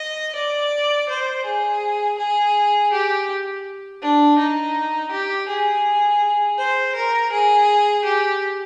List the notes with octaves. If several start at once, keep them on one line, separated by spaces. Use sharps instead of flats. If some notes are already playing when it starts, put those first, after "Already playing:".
Already playing: D#5
D5
C5
G#4
G#4
G4
D4
D#4
G4
G#4
C5
A#4
G#4
G4